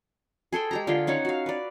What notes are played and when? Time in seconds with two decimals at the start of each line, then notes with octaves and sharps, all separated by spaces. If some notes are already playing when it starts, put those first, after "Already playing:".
0.52 G#4 A4 C5 G5
0.71 G#3 G4 A#5
0.87 D3 F4 G#4 G5
1.07 C#4 D#4 C#5 F#5
1.25 F#4 F5
1.46 B4 D5